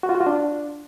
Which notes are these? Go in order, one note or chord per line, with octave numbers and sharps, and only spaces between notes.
F#4
F4
F#4
F4
D4